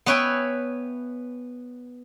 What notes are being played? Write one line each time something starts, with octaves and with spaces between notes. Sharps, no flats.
B3 B4 C#5 E5 G5 G#5